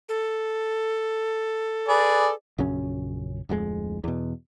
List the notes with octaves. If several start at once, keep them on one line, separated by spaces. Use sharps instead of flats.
A4
G#4 B4 D5
A#1 F#2 C#3 C#4
D1 F2 F#3 G#3
E2 B2